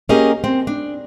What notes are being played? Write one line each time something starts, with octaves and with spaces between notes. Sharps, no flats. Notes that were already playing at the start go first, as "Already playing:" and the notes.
A#3 C#4 G4 G#4 A#4 D#5
C4
D4